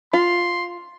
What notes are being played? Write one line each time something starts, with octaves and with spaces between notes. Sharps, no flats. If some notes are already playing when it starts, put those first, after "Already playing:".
F4 C6